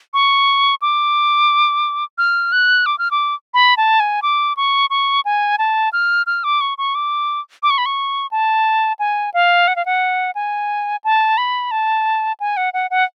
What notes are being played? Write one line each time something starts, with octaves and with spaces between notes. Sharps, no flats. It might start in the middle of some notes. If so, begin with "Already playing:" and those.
C#6
D6
F6
F#6
D6
F6
D6
B5
A5
G#5
D6
C#6
C#6
G#5
A5
F6
F6
D6
C#6
C#6
D6
D6
C#6
B5
C#6
A5
G#5
F5
F#5
F5
F#5
G#5
A5
B5
A5
G#5
F#5
F#5
F#5